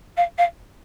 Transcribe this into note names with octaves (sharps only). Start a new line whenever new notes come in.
F5
F5